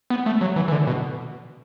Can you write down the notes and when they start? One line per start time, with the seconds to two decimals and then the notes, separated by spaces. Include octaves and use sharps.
0.10 B3
0.26 A3
0.41 F#3
0.56 E3
0.68 E3
0.72 D3
0.87 B2